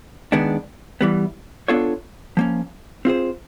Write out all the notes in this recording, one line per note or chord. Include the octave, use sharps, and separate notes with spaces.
D#3 G#3 B3 D4
E3 G3 B3
B3 D4 F4 A4 C#5
F3 A#3 C#4
C4 F4 G#4 C5